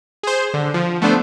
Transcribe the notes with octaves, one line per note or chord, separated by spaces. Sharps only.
G#4 C5
D3
F3
A3 B3 D4 C5